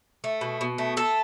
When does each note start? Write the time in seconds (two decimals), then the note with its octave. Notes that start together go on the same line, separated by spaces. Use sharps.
0.24 A3
0.41 B2
0.61 B2
0.78 A3
0.97 A3 A4